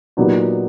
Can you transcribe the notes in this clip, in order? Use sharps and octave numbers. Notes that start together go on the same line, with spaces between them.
A#2 F#3 B3 D#4 G4